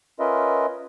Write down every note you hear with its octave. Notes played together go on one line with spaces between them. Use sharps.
C#4 F4 A#4 B4 D#5 E5